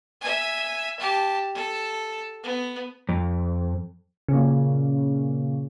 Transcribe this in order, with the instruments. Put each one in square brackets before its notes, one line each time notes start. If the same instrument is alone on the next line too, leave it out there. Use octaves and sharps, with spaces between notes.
[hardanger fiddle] E5 G#5
G4 A5
A4
B3
[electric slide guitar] F2
[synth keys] A#2 C#3